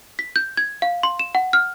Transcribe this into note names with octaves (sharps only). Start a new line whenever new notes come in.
B6
G6
G#6
F5
C6
E7
F#5
F6